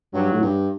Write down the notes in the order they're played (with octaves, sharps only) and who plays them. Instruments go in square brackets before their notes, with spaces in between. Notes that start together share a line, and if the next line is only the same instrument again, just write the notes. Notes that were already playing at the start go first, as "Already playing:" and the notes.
[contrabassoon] G2 [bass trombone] F#3
[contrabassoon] A2
G2